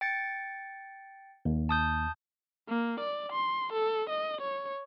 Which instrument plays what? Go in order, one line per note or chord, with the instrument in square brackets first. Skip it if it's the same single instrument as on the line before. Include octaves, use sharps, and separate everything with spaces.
[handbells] G5 A6 C#7
[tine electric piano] D#2
[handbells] A5 D#6 G6
[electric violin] A#3
D5
C6
A4
D#5
C#5